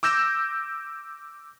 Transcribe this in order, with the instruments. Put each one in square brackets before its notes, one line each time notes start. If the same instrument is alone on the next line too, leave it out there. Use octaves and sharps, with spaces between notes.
[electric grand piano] D6 E6 G6 A#6 E7